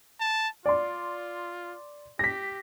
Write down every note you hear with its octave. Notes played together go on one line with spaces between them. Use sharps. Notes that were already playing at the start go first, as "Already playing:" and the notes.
A5
F4 D5 C6
G4 A#6 B6